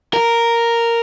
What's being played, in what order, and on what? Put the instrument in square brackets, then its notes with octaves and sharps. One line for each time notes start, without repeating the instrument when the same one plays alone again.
[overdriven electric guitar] A#4